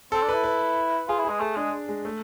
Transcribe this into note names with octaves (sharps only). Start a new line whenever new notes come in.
C4 A4
D4
E4 B4
B4
F4 G#4
E4
G#3 G#4
A3 G#4
G#3 D4
G#3
A3